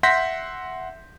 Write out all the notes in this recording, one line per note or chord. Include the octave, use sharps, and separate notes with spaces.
E5 F#5 C6 G6 A#6 B6